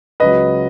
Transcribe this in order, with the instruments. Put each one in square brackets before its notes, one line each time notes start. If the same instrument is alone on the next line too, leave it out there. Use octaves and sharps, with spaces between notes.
[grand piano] C#2 C#3 F#3 B4 D#5